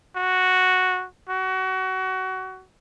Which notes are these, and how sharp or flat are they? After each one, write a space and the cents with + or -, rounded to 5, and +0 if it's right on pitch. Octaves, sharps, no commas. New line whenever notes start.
F#4 -5
F#4 +25